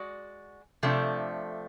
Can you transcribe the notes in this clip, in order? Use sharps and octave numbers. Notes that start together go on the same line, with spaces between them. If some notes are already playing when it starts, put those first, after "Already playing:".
Already playing: G#3 F#4 D5
C3 F3 A3 D4